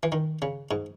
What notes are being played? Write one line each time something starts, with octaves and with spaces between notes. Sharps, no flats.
E3
D#3
C#3
G#2